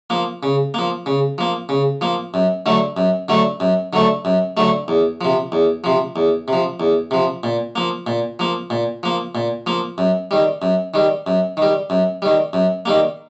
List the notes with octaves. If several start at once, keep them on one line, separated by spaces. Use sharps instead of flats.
F3 A#3
C#3
F3 A#3
C#3
F3 A#3
C#3
F3 A#3
F#2
D3 F#3 A3
F#2
D3 F#3 A3
F#2
D3 F#3 A3
F#2
D3 F#3 A3
E2
C3 F3
E2
C3 F3
E2
C3
F3
E2
C3 F3
A#2
F3 A#3
A#2
F3 A#3
A#2
F3 A#3
A#2
F3 A#3
F#2
D#3 G3
F#2
D#3 G3
F#2
D#3 G3
F#2
D#3 G3
F#2
D#3 G3 A#3